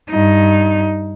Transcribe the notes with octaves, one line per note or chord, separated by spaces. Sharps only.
G2 D#4